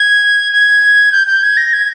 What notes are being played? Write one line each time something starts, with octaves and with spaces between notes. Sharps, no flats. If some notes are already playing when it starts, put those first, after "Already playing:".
Already playing: G#6
G#6
G6
G6
G#6
A#6
G#6